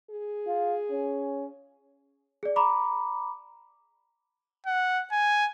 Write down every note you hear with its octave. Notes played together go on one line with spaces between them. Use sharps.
G#4
F4
C#4
G#4 D5
A#5 B5 D6
F#5
G#5